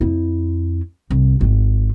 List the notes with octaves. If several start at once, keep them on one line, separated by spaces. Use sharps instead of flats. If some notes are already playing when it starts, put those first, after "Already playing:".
F2 E4
C2
G#1 F4